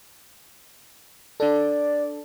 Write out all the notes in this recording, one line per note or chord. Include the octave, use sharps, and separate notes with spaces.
D4 A4 D5